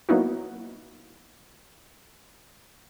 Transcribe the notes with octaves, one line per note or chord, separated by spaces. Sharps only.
F#3 A#3 B3 D#4 E4 F#4